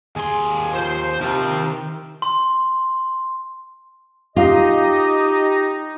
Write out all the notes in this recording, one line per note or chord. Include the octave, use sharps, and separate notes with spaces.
D#2 G#4 C6
F3 C5
C3 D#3 F3 C4
C6
D#4 F4 G4 D#5